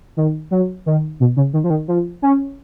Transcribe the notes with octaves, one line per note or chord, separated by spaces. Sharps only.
D#3
F#3
D#3
B2
C#3
D#3
F3
D#3
F3
C#4